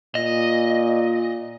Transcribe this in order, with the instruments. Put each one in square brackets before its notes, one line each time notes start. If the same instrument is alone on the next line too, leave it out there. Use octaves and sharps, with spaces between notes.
[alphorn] A#2 [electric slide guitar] D#5